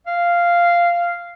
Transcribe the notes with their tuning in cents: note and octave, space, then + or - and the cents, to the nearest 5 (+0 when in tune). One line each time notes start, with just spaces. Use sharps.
F5 -10